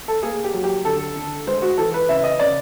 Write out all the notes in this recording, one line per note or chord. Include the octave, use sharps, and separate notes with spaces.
A4
A#3 G#4
G4
F#3
G4
D3 A4
D3
G#3 C5
F#4
E3 A4
B4
C#3 E5
D#5
C#3 D5